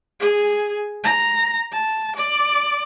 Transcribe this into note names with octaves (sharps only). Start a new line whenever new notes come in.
G#4
A#5
A5
D5